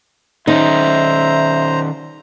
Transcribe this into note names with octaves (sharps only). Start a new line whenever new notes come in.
D#3 C#4 D#4 C5 E5 A#5